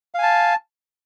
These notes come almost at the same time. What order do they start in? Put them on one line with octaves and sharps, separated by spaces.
F5 G#5 A5